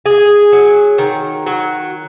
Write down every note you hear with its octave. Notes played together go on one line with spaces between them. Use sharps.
G#4
F#3
D#3
F#3